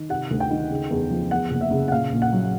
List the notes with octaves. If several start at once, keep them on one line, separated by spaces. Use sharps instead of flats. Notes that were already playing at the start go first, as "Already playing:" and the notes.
Already playing: D#3
C3 F#5
D2
G5
D#3
C#3
E2
F3
E2 F#5
F#1
E5
C#3
F#5
A#2 F5
A#1
F#5
F#3